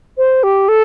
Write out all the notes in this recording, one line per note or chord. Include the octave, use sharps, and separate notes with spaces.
C5
G4
A4